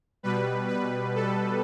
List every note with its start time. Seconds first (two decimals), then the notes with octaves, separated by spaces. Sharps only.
0.23 B2 G3 B4
0.68 B4
1.15 A4